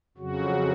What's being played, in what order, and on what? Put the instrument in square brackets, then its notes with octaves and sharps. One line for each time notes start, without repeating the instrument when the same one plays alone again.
[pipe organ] F2 C#3 F#3 F#4